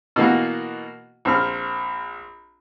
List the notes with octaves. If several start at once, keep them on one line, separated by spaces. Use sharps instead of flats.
B2 E3 A#3 F#4
A#1 C4 F6